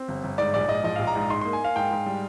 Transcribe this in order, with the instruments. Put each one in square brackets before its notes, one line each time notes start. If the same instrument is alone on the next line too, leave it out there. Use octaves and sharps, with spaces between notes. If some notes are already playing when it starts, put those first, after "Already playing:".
Already playing: [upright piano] C4
G1
G1
[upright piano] G#2 [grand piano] D5
[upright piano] A#1 [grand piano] D5
[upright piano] G#2 [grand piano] D#5
[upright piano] F3 [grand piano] D#5
[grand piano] F5
[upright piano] A#1
[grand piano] A#5
[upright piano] G#2
[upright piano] D#4 [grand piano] C6
[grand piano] C6
[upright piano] A#3
[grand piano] G#5
[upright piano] A#3 [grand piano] F5
[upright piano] G#2 [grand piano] G5
[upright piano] G#2
G3